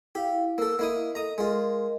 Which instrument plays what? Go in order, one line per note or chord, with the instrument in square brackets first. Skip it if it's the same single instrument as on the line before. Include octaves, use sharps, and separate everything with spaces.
[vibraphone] E4 F5 [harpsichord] G4
[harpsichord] A#3 A4 [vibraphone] E6
[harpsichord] A#3 E4 D#6 [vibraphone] D#5
[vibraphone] A4 D#5 [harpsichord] A#5 D#6
[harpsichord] G#3 F4 [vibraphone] A#4 D#5